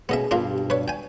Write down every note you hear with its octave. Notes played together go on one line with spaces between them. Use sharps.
B2 A3 B3 C#4 G#4 D#5 E5
G2 B2 D4 F4 A#4
G4
B4 C#5 D5
G5 G#5